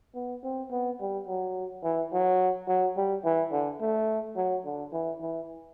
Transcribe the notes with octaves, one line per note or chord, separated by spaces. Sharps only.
B3
C4
B3
G3
F#3
E3
F#3
F#3
G3
E3
D3
A3
F#3
D3
E3
E3